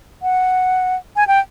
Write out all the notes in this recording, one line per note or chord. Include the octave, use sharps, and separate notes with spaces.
F#5
G#5
G5